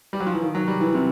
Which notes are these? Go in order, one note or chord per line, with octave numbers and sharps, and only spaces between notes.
G3
F#3
F3
E3
D#3
F#3
G3
E3
C3